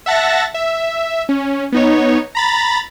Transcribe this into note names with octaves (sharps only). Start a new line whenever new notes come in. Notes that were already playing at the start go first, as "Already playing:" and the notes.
E5 F#5 A5 A6 A#6
E5
C#4
B3 D#4 C#5
A#5 B5 A6